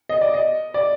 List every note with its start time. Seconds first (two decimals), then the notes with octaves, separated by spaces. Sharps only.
0.09 D#5
0.21 D5
0.34 D#5
0.74 D5